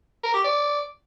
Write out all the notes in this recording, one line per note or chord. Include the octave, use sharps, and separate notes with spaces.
A#4
G4
D5